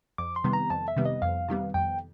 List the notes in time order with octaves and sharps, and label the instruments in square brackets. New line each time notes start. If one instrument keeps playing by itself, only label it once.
[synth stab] F2 [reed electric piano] D6
[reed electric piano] C6
[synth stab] C3 D#3 G3 B3
[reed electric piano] A#5
[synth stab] F2 [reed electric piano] A5
[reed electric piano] E5
[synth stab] C3 D#3 G3 B3
[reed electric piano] D#5
[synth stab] F2 [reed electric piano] F5
[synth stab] C3 D#3 G3 B3
[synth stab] F2 [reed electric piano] G5